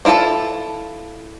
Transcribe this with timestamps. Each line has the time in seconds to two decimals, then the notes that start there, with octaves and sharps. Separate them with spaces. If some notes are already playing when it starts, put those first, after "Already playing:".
0.05 C4 E4 F4 A4 A5